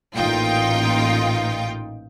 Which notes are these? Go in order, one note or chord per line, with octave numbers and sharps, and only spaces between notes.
A1 A#2 D#4 F4 G5